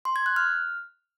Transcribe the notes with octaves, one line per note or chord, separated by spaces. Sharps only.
C6
G#6
F#6
F6